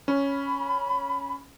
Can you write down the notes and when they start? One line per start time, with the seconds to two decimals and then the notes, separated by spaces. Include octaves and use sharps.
0.08 C#4 B5